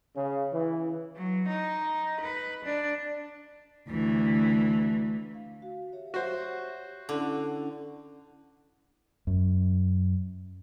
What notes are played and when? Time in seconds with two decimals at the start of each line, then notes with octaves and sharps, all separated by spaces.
0.16 C#3
0.53 E3
1.16 F#3
1.48 D#4
2.21 B4
2.65 D4
3.88 D2 E3
5.34 F5
5.62 F#4 F5
5.92 G4 C#5 E5
6.14 F#4 C5
7.09 D3 C#4 E4 F#5
9.27 F#2